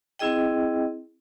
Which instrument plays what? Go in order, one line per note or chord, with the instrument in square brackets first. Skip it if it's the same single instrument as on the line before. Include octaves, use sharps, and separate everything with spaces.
[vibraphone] C4 E4 G#4 D#5 G5